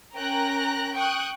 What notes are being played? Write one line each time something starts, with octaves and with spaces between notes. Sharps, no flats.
C#4 A#4 G5 A#5 F#6 A#6
G5 C#6 D#6 F#6